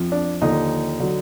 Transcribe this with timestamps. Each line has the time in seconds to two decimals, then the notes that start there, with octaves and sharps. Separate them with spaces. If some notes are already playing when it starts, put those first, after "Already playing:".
Already playing: F2 F3
0.12 D4
0.41 D#2 D3 F3 D#4
1.00 D3 F#3